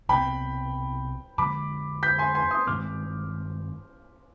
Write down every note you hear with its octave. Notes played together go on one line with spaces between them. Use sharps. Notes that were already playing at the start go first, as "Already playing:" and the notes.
C2 B2 G3 C4 G5 B5
F2 D3 F3 G#3 B5 D6
G6 B6
G#5 C6
G#5 C6
C6 D#6
G2 D#3 G#3 C4 D6 F6